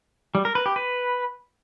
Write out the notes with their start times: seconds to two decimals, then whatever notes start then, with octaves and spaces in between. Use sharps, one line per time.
0.35 G3
0.45 A#4
0.55 B4
0.66 G4
0.76 B4